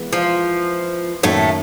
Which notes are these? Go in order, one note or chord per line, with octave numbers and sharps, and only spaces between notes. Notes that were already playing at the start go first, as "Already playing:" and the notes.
Already playing: E3 G#3 B3 E4
F3
F#2 A2 D#3 F#3 A3 A#3